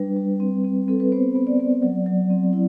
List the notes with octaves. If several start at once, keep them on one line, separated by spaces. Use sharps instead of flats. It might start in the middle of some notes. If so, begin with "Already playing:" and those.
Already playing: G3 D4 B4
G3
C4
C4
C4 A4
B4
B3 C5
B3
D5
B3
F#3
F#3
C4
E4